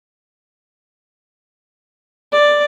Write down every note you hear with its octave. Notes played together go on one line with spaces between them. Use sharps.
D5